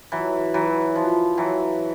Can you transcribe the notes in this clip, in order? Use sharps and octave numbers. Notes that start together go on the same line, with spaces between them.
E3 F#3
E3 F#3
F3
E3 F#3